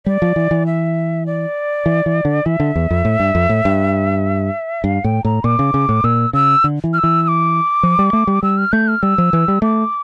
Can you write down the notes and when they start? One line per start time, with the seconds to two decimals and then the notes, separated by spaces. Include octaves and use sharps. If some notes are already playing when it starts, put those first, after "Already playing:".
0.06 G3 D5
0.22 F3
0.36 E3
0.51 E3
0.66 E5
1.26 D5
1.86 E3
2.06 E3
2.25 D3
2.46 E3 E5
2.60 D3
2.76 E2
2.91 F2
3.05 A2
3.20 G2
3.35 F2
3.49 A2
3.65 G2
4.84 G2 F5
5.04 A2 G5
5.25 A2 A#5
5.44 A#2 D6
5.59 C#3
5.74 C#3
5.89 A2
6.04 A#2 E6
6.33 C#3 E6
6.64 D3
6.84 E3
6.93 F6
6.98 E6
7.03 E3
7.23 E6
7.28 D6
7.83 F3
7.99 G3
8.13 A3
8.27 G3
8.43 G3 E6
8.58 F6
8.72 A3 G6
8.88 F6
9.02 G3 E6
9.18 F3
9.33 E3
9.48 G3
9.62 A3 D6